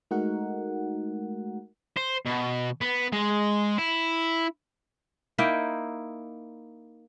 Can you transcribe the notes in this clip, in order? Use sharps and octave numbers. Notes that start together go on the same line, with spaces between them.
G#3 A3 D#4 F#4 A#4 F#5
C5
B2
B3
G#3
E4
A#3 D#4 E4 G5